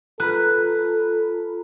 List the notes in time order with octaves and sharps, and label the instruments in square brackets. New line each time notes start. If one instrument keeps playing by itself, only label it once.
[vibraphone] F4 A#5 B5 [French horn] A4 [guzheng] B4